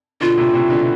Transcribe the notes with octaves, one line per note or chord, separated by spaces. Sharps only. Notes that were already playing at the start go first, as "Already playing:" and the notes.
B2 D3 F4
A2 C3
A2 C3
B2 D3